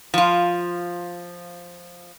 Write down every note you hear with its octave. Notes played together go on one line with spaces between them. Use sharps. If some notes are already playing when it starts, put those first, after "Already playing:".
F3 F4